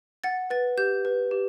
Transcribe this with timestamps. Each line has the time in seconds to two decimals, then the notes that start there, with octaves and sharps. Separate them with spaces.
0.24 F#5 A6
0.50 B4 A6
0.77 G4 G6
1.05 B4
1.31 G4